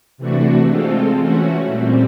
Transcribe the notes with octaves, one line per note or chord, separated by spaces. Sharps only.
C3 E3 A3 D4 F#4
G#3 C4 F4 A4
E3 A3 C#4 F#4
A#2 G3 C4